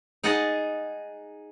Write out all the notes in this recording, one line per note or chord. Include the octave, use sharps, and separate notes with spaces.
D#4 G#4 D#5 F#5 A5